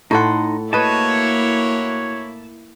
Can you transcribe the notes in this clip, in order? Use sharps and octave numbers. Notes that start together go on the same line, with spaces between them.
A2 D#4 A4 F#5 C6
A#3 E4 F#4 B4 C#5 D#5 A5